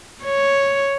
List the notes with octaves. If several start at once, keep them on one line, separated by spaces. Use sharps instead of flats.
C#5